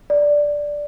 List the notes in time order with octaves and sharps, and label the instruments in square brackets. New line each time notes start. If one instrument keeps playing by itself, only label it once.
[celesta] D5